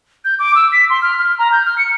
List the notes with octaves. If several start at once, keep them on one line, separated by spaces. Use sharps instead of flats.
G6
D6
E6
B6
C6
F6
F6
A#5
G6
F6
C#7